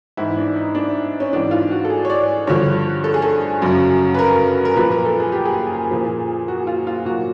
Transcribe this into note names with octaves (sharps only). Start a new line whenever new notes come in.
G#2 E3 E4
D4
D#4
D4
C#4
G#2 E3 D4
F4
F#4
A4
G#4
C#5
D5
G2 D3 F3 C#5
A4
G#4
A4
F#2 C#3 F#3
B4
A#4
A#4
A#2 F3 B4
A#4
A4
G#4
G4
G#4
A#2 F3
F#4
F4
F4
A#2 F#3 F#4